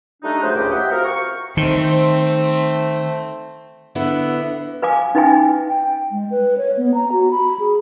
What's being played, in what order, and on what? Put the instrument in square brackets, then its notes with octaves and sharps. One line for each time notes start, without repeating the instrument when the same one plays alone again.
[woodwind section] G3 A3 D4 D#4
F3 F#3 A3 G#4 B4 C5
C#2 A2 G4
G4 D#5 E5 F#5 G5
C4 F4 F#4 A#4
C#6
[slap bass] D#3 [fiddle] A3 C4
[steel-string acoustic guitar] D3 B3 E4
[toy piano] B4 F5 G#5 D6
C#4 D#4 B4 E5 G5 G#5
[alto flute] G5
G#3
B4
C#5
B3
A#5
F#4
B5
G#4